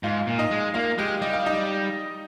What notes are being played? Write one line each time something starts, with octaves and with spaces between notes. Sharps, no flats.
G#2 F4
A#2
D#4 D#5
G#3
A#3 F4 F5
G#3 G4 G5
G3 D#5
F5
D#4 D#5